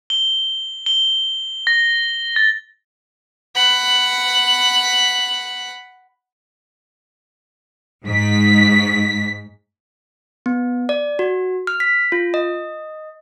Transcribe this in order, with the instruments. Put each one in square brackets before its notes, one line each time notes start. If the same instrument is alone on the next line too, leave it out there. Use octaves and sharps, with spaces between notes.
[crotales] G7
G7
A#6
A6
[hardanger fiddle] F#5 B5
[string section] G#2 B6
[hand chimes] B3
D5
F#4
F6
B6
F4
D#5